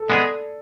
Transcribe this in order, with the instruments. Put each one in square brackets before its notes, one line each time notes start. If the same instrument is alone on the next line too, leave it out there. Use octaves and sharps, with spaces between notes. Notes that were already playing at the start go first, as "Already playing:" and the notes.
Already playing: [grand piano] A4
[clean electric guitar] G#3 B3 E4 G#4 [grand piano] D5